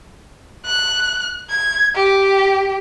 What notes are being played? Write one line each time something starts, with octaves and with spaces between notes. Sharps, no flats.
F#6
G#6
G4